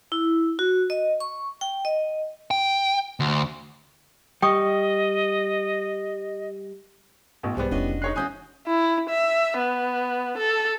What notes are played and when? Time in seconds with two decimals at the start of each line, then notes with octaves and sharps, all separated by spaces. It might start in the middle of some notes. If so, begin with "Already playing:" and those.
0.12 E4
0.59 F#4
0.90 D#5
1.20 C#6
1.61 G5
1.85 D#5
2.51 G5
3.20 D2
4.42 G3 D#5 G5 C#6 D#6
7.43 A1 B2
7.57 C2 G#2 G3 G#3 B3 D5
7.71 F1 C#3 C#4 D4 E4 F#4 C#5 D#5
8.02 D#4 C#5 F#6 C7
8.16 E3 C#4 F#4 G#5 D#6 G6
8.68 E4
9.09 E5
9.58 B3
10.38 A4